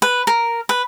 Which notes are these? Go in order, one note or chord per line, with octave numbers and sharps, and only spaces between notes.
B4
A#4
B4